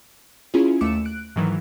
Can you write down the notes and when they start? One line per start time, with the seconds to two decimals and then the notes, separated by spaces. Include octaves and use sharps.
0.54 C#4 E4 F4 G#4
0.81 D#2 A3 D6 E6 C#7 E7
1.05 F#6 D7
1.36 G#2 D#3 E3 F#3